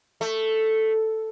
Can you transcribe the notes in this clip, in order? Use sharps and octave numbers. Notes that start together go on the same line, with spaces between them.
A3